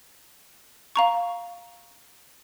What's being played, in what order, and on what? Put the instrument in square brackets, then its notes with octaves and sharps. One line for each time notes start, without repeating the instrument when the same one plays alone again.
[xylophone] F5 A#5 C#6